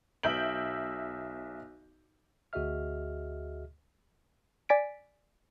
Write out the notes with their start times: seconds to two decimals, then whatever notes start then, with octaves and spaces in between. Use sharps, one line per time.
0.23 B1 E5 G6 D7 F#7
2.53 D2 F#4 G#4 D#5 E5 F6
4.69 D5 G#5 A6 B6 D7